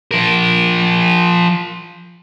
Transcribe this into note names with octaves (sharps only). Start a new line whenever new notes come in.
F3 A#4